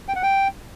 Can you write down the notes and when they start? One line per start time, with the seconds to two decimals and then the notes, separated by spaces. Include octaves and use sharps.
0.08 G5
0.16 F#5
0.23 G5